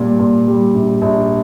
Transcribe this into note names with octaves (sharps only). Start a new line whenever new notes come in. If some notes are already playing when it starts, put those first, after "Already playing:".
Already playing: A#2 G3
A#2
G3
A#1
A#1